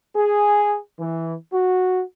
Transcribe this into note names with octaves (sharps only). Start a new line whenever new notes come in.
G#4
E3
F#4